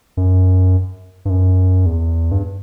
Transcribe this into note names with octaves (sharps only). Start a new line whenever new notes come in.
F#2
G2
F#2
E2
G2